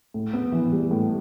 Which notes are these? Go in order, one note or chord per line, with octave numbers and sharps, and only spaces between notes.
A2
B3
E3
G3
A2